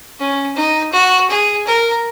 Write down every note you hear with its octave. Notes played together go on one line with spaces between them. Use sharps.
C#4
D#4
F#4
G#4
A#4